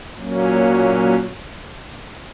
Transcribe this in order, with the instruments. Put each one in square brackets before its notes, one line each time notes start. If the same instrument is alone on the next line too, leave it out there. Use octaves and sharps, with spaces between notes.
[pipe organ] A#2 F#3 A#3 C#4